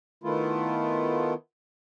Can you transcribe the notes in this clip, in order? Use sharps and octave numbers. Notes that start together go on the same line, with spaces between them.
D#3 A3 B3 E4 F4